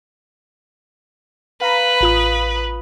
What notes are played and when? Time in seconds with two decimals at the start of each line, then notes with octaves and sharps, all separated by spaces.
1.61 B4 F5 A#5 B5
2.01 A1 F4 D#6